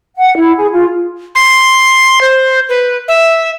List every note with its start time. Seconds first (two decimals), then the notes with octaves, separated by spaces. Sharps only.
0.16 F#5
0.37 E4
0.57 G#4
0.72 F4
1.35 C6
2.21 C5
2.69 B4
3.08 E5